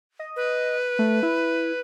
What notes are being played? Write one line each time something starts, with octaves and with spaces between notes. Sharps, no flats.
D#5
B4
A3
E4